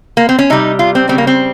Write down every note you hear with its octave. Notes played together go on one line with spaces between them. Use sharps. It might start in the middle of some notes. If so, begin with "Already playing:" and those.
A#3
C4
C#4
C3 G3 D#4
F4
C4
C#3 G3 C4
A#3
C4